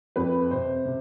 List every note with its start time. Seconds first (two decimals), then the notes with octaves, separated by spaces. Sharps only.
0.16 F2 B4
0.51 C3 C5
0.86 C3